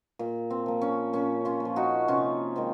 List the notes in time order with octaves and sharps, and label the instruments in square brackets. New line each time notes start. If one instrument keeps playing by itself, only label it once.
[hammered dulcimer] A#2
C4
F3 A#3
C#4
A#2 C#4
C#4 F4
A#3
F3
D#4 F#4
C3 C#4 F4
D#3 G#3 C4